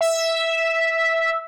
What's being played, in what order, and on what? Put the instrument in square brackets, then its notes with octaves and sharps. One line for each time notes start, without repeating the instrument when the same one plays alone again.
[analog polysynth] E5